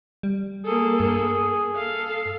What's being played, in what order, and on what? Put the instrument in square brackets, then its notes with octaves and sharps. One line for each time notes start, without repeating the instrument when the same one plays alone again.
[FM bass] G3
[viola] A#3 A4 [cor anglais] G#4
[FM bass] G2
[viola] A4 F5